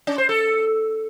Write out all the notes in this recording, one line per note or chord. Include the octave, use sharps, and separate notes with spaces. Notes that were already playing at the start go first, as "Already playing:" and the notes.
C#4
C5
A4